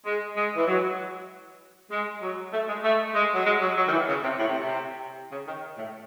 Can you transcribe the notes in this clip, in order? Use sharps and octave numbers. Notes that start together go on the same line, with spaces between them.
G#3
G#3
E3
F#3
G#3
F#3
A3
G#3
A3
G#3
F#3
G#3
F#3
F#3
D#3
E3
C#3
C3
A2
C3
C3
C#3
D#3
A2